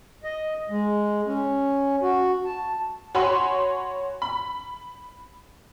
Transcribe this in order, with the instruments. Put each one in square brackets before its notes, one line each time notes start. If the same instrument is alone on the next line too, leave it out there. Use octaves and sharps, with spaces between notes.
[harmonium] D#5
G#3
C#4
F#4
A5
[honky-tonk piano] F#4 C#5 G#5 B5 C6
B5